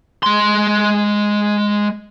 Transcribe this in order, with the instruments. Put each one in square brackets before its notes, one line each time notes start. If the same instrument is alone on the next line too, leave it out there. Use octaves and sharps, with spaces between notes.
[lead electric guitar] G#3 C6